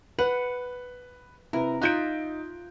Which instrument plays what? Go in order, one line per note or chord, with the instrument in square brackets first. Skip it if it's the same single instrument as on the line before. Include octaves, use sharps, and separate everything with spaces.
[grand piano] B4 [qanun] F#5
[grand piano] C3 [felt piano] E4 B4 [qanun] A#4
[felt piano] D#4 G6 D7 [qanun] F4 D#5 E5 [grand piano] F#6